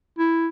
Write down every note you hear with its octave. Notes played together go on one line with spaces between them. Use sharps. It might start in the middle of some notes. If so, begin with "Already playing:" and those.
E4